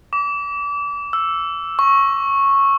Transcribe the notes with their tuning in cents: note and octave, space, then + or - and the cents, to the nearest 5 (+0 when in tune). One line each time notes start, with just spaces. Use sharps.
D6 -30
E6 +5
C#6 -10